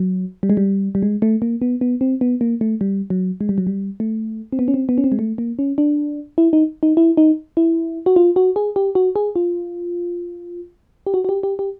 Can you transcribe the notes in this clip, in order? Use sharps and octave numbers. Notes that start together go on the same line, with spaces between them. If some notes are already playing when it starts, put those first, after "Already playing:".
Already playing: F#3
G3
G#3
G3
G3
G#3
A3
A#3
B3
B3
C4
B3
A#3
A3
G3
F#3
G#3
G3
F#3
G3
A3
C4
B3
C#4
C4
B3
C#4
C4
G#3
A3
A#3
C#4
D4
E4
D#4
D#4
E4
D#4
E4
F#4
F4
F#4
G#4
G4
F#4
G#4
F4
G4
F#4
F#4
G4
G4
G4